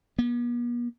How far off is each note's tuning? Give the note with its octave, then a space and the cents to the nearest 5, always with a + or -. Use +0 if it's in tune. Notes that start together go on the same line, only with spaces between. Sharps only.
B3 -45